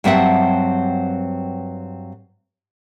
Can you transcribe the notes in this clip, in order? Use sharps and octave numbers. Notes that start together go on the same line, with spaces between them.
G2 F#3 C4 E5 F#5 A5